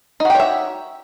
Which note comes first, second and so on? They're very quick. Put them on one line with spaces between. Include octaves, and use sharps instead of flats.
D#4 F#4 G4 C#5 E5